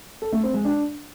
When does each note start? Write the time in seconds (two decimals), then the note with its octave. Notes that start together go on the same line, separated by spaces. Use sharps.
0.22 A4
0.33 A3
0.43 C4
0.54 G#3
0.65 D4